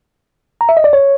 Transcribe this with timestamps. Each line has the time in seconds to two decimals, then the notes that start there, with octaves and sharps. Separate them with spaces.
0.61 A#5
0.69 E5
0.77 D#5
0.84 D5
0.93 C#5